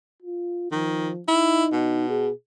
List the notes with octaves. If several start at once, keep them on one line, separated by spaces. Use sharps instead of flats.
F4
D#3 F3
D#4 E4
B2
G#4